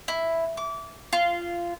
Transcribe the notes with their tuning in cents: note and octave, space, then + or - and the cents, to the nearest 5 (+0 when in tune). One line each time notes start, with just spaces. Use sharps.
E4 +0
D6 -25
F4 -15